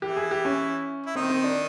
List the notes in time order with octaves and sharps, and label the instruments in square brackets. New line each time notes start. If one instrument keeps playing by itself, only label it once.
[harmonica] E3 E4 [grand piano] G4
[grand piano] G#4
G4
C#4
[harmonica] E4
[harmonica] D#3 D#4 [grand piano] C4
[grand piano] C4
D4